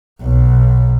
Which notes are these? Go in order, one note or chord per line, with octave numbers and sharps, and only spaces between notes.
B1